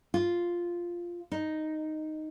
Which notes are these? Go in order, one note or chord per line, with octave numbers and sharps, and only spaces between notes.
F4
D#4